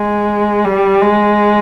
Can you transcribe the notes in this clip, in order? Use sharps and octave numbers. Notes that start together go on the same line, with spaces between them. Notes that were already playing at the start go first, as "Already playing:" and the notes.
Already playing: G#3
G3
G#3